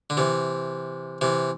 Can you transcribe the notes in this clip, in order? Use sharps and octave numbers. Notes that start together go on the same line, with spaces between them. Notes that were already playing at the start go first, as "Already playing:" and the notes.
D3
C3 E3
C3 E3